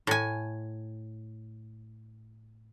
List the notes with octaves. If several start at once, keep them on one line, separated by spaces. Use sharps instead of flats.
A2 G#5